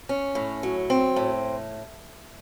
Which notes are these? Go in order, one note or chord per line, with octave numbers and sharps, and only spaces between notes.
C#4
A2
F#3
C4
A2